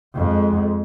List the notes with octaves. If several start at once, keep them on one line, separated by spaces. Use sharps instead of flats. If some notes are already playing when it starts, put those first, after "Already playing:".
F2 G#3